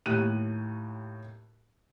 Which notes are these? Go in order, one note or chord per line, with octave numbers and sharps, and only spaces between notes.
D#2 A2 G4 F#6 D#7